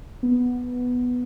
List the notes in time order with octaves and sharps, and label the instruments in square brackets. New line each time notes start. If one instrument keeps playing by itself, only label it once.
[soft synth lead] B3